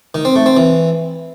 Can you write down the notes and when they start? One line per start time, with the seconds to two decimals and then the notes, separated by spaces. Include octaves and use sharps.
0.14 D#3
0.25 C4
0.35 A3
0.46 C4
0.57 E3